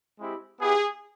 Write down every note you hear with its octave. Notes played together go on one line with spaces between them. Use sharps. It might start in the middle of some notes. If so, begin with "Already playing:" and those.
G#3 C4 E4 G4
B3 E4 G4 G#4